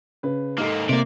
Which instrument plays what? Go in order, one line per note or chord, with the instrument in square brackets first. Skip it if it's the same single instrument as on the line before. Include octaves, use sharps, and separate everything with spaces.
[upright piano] C#3 B4
[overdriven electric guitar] G#2 A#3 [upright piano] D#4 A4
[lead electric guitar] C3 A#3 [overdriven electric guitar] D5